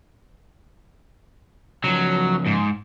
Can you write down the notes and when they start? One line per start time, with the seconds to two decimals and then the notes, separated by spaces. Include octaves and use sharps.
1.84 C#3 F3 F#3
2.47 G#2